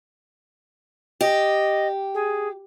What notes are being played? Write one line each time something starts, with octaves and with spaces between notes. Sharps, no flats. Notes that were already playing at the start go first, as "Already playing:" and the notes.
G4 D#5
G#4